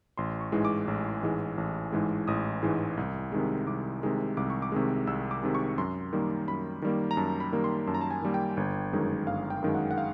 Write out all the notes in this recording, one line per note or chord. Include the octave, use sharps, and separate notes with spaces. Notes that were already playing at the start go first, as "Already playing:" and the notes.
A1 C6
C#6
G#2 E3 G#3
D6
A1
G#2 E3 G#3
A1
G#2 E3 G#3
A1 D#6
G#2 E3 G#3
C2
C3 D#3 G#3
C2 D6
C3 D#3 G#3
C2 D6
C#6
D6
C3 D#3 G#3
C2 E6
D6
C3 D#3 G#3
C#6
F#2 C6
D#3 G3 A#3
F#2 B5
D#3 G3 A#3
A#5
F#2 A5
B5
D#3 G3 A#3
C6
F#2 A5
A#5
A5
G#5
D#3 G3 A#3
G5
G1
F#2 D#3 G#3
G1 F5
G5
F#2 D#3 G#3
F#5
F#5
F5